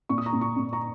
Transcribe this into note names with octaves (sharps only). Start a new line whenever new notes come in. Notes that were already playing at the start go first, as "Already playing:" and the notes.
A#2 C#6
D#6
A#5 C#6
A#2
A#5 C#6
A#2
A#5 C#6